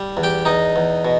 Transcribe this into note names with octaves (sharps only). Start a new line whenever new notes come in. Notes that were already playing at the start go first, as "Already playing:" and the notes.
Already playing: G3
E2
G4 G5
E2 D#4 D#5
E2
B2